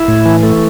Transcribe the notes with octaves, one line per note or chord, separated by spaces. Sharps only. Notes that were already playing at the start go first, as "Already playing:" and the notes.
Already playing: E4
A2
E3
A3